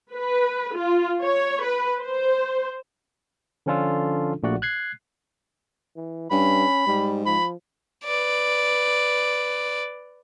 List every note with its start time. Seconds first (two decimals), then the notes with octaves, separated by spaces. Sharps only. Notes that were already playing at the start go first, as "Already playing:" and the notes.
0.16 B4
0.76 F4
1.24 C#5
1.64 B4
2.00 C5
3.66 D3 F3 C#4 D4 F4 A4
4.43 A#1 A#2 A3 F#4 D5 F#5
4.62 F#6 G#6 C7
5.96 E3
6.31 G2 C#4 B5
6.87 G#2 G3
7.26 F3 B5
8.05 B4 D5